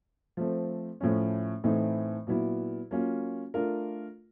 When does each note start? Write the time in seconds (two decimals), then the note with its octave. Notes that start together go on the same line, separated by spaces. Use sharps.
0.37 F3 A3 C4
1.01 A2 F3 A3 C#4
1.64 A2 E3 A3 C4 D#4
2.27 A#2 F#3 B3 E4
2.91 F#3 A#3 C#4 F4
3.54 A3 D4 F4 A#4